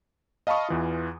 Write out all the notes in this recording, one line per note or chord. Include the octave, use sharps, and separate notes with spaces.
D#5 F5 A5 B5 C#6 D#6
E2 E3 F4